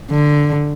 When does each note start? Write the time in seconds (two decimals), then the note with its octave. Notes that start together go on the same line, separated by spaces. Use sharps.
0.11 D3